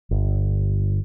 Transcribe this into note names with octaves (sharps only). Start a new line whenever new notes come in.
G1